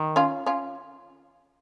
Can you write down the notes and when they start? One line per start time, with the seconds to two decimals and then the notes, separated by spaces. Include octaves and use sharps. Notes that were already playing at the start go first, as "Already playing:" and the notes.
Already playing: D#3
0.16 C#4 F4
0.46 C#4 F4